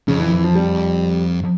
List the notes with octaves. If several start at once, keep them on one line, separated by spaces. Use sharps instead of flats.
F2 C#3
E3
E3
F3
G3